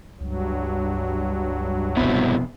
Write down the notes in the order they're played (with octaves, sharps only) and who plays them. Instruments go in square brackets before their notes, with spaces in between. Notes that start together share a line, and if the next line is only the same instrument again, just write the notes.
[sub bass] C#2 [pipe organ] G2 F#3
[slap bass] F1 B3 [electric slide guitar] B2 C4 E4